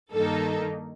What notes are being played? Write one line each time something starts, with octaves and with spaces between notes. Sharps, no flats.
G2 D#3 A#3 D#4 A4